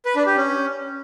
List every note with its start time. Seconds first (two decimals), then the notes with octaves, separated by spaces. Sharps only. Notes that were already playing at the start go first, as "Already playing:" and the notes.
0.05 B4
0.16 D4
0.26 G4
0.37 C#4